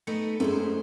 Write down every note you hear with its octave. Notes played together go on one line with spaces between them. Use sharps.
A3 B3 D#4 C#7
F#2 G#3 A3 E4 C5